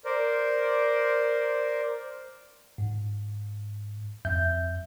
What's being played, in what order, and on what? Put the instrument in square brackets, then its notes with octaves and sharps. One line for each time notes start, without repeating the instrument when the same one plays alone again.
[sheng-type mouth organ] A#4 C5 D5
[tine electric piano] G#2
F2 E5 G6